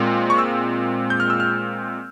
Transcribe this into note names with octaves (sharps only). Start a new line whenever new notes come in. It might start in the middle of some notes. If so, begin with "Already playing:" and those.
Already playing: A#2 G#3 C4 F4
C#6
E6
G6
F6
E6
F6